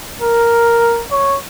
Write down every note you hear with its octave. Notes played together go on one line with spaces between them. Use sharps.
A#4
C#5